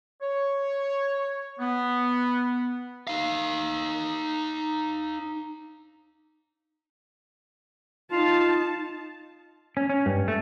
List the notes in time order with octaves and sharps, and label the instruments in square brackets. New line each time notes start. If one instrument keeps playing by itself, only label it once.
[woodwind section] C#5
B3
[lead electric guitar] D#4 F5
[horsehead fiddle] D#4 A5 [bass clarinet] F4
[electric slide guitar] C#4
C#4
G2
A3